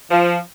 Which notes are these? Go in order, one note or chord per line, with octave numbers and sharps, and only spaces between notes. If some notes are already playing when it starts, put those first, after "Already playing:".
F3